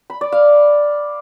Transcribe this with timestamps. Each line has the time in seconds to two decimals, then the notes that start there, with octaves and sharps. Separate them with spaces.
0.10 B5
0.21 D5
0.32 F5